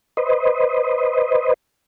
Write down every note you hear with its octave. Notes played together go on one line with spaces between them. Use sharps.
B4 C5 D#5